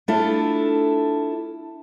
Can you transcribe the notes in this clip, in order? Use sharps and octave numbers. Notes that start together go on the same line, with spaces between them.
A3 D4 E4 F4 A4